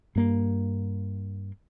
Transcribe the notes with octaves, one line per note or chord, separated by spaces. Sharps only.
G2 A#3